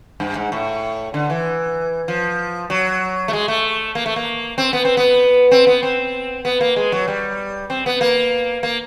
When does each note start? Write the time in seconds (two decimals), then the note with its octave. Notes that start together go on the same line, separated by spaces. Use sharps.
0.20 G2
0.35 G#2
0.52 A2
1.14 D3
1.30 E3
2.08 F3
2.70 F#3
3.28 A3
3.33 G#3
3.48 A3
3.95 A#3
4.06 A3
4.16 A#3
4.58 C4
4.73 B3
4.85 C4
4.97 B3
5.51 C4
5.67 B3
5.83 C4
6.45 B3
6.61 A#3
6.76 G#3
6.92 F#3
7.08 G3
7.70 C4
7.86 B3
8.01 A#3
8.63 A#3